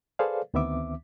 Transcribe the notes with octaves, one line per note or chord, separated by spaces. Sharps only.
G#4 A4 B4 C5 D5 F5
D2 D#3 B3 C4 E5 D6